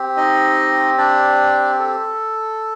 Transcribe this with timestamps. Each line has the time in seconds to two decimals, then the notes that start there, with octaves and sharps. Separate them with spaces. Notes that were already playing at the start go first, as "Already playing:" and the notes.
Already playing: C4 G4
0.17 D#4 D#5
0.98 D4 D5
1.79 A4